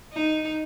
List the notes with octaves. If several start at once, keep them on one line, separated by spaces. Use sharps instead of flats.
D#4